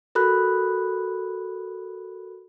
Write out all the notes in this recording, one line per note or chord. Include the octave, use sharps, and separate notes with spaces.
F#4 A4 A#4 B5 F#6